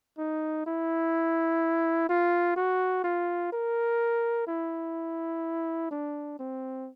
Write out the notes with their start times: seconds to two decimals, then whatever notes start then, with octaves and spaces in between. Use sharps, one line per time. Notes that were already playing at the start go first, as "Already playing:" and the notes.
0.18 D#4
0.66 E4
2.09 F4
2.56 F#4
3.04 F4
3.53 A#4
4.47 E4
5.91 D4
6.39 C4